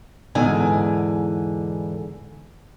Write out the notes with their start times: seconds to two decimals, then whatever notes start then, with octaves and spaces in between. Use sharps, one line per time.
0.35 E2 G#2 D3 G#5